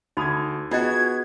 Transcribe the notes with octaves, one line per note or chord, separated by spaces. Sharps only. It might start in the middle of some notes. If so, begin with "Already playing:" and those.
D2 D#4 F#4 B5 D#6 G#6
B3 F4 F#4 G#4 D#5 G5 G#6